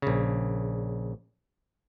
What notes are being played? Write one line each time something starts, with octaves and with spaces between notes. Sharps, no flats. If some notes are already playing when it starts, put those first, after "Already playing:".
A#1 C#3